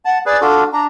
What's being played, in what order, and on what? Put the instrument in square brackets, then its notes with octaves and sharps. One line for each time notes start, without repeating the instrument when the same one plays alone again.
[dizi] F#5 [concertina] A5
[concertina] G#4 B4 [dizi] D5
[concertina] D4 F4 F#4 [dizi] A4
[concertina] D4 [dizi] A#5